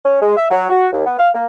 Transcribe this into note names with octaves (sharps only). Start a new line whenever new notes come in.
C#4
G#3
E5
F#3
F#4
D#2
B3
F5
A#3